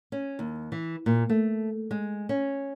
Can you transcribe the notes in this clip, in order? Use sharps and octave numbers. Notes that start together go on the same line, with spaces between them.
C#4
D#2
E3
A#2
A3
G#3
C#4